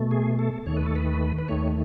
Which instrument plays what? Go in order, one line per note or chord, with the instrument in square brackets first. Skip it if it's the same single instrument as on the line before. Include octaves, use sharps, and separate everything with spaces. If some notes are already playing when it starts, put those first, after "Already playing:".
Already playing: [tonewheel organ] B2 A3
G#4
A4
D#2 D#3 A3 C#5
B4
A4
B4
B4
D#2 D#3 A3 C#5